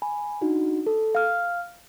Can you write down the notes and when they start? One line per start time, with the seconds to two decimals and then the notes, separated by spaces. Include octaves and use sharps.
0.02 G#5 B5
0.41 D4 D#4 F#4
0.87 A4
1.15 F5 F6